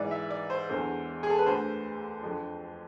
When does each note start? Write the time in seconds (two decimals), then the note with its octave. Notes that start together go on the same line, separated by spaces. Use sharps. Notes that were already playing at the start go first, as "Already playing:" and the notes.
Already playing: G#2 E3 D5
0.11 E5
0.30 D5
0.50 C5
0.69 E2 D3 C5
1.23 G#4
1.30 A4
1.39 B4
1.45 D2 D3 C5
2.23 F2 D3